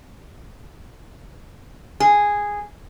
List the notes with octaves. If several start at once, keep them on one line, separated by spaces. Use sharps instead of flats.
G#4